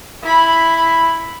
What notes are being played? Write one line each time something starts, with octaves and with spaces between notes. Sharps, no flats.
E4 B5